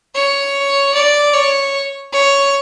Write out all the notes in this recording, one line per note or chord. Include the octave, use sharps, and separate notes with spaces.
C#5
D5
C#5
C#5